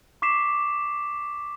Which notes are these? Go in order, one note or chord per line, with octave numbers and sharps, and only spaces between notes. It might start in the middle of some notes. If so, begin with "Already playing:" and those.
C#6 D6 B6 C7 E7